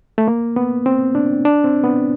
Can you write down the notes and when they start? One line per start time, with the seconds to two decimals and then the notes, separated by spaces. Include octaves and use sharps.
0.18 A3
0.28 A#3
0.56 B3
0.86 C4
1.15 D4
1.45 D4
1.64 C4
1.84 B3